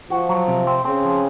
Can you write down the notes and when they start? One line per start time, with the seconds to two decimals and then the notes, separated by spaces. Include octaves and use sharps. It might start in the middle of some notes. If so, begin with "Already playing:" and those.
0.10 F3 F#4
0.29 F#3
0.48 C3
0.67 C4
0.85 C#3 C4
1.05 F3